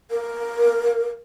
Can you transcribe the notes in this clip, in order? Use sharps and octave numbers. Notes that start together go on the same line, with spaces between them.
A#4